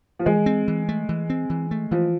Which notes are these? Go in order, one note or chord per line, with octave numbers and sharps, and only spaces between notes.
F3
E3 G#3
C4
E3
A3
E3
C4
E3
A3
E3 F3